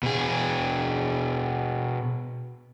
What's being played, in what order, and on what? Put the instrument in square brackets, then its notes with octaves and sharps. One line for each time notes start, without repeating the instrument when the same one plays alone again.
[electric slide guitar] B2 G#4